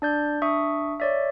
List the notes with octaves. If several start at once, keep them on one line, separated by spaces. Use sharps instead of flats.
D4 D5 G6
D4 E5 C#6 D#6
C#5 D5 E5